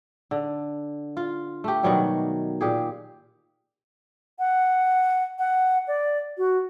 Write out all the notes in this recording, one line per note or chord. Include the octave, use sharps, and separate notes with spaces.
D3
F4
A3 G4
B2 D#3 F#3 G3
A#2 G4 G#4
F#5
F#5
D5
F#4